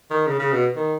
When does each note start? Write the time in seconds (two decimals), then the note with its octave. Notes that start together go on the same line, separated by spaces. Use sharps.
0.10 D#3
0.27 C#3
0.39 C#3
0.52 B2
0.76 D#3